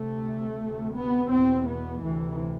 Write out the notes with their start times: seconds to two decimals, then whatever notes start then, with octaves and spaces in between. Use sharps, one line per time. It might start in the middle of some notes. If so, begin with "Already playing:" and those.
Already playing: D2 C3 A3
0.60 D2 C3
0.97 B3
1.32 E2 B2 C4
1.68 B3
2.04 D2 C3 E3